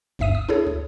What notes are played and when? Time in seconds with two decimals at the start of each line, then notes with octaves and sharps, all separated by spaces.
0.19 G1 D2 G2 E5 D#6 D#7
0.35 D#6
0.49 D4 E4 G#4 A4 C#5
0.67 D2